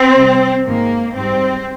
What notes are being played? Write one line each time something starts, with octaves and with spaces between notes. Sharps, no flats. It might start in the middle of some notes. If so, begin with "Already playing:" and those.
Already playing: C4
C3 G3
G#2 D#3 G#3 A#3
G#2 G3 C4